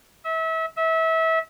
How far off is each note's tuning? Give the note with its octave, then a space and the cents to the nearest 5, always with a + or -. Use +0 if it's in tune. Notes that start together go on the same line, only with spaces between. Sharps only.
E5 -30
E5 -25